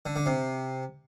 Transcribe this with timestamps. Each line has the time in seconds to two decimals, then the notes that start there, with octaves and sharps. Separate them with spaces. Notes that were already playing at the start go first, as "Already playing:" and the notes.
0.06 D3
0.16 D3
0.26 C3